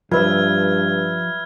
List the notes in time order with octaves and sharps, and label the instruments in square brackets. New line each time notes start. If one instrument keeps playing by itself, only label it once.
[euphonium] G2 [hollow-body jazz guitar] F3 [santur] B4 E5 [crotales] F6 G#6